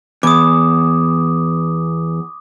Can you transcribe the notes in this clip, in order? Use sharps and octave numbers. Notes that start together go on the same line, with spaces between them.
E2 D6 D#6